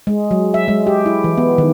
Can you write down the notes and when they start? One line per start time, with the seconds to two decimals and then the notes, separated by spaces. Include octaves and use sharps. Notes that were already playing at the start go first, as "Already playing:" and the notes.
0.07 G#3
0.31 F#3
0.54 E5
0.68 G#3
0.87 G4
1.06 E4
1.24 E3
1.37 B3
1.58 D#3